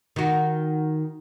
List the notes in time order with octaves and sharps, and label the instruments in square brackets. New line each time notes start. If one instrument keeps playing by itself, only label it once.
[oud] D#3 F#4